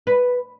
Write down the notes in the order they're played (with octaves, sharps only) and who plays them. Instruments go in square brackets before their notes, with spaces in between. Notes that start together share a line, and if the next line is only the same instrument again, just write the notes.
[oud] B4